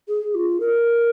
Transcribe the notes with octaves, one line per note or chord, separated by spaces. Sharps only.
G#4
F4
A#4